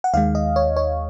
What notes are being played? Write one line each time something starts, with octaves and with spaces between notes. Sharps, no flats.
F#5
D#2 D#3 G#3 F5
D#5
C#5
C#5